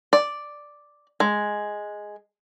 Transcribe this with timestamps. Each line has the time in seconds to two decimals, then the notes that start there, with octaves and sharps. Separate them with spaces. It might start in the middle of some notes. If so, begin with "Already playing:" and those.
0.13 D5
1.20 G#3